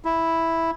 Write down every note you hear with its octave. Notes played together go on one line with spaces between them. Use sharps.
E4